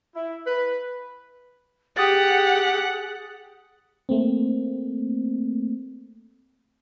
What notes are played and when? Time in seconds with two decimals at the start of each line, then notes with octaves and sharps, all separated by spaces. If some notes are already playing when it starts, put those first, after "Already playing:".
0.15 E4
0.46 B4
1.97 G4 G#4 F#5 D#6 A6
4.09 A3 A#3 C4